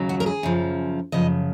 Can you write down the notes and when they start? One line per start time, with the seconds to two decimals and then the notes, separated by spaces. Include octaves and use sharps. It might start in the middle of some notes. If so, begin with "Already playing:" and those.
Already playing: D#2 C#3 F#3
0.09 F#4
0.20 A#4
0.26 G#4
0.43 F#2 C#3 F3
1.12 F#2 C#3 F3 D#5